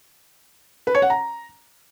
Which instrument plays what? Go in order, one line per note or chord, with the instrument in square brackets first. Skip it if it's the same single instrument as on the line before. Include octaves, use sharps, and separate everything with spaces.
[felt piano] B4
C#5
F#5
A#5